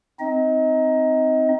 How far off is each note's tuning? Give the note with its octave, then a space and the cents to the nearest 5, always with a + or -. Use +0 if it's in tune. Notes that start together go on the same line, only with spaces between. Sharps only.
C4 -20 D#4 +0 D#5 +25